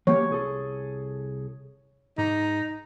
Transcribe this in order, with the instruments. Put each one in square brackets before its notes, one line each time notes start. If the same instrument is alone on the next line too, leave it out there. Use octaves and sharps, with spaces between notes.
[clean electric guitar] F#3 A#3 G4 [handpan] C#5
[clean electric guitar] C2 G#4 A4
[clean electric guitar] G#2 [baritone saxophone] D#4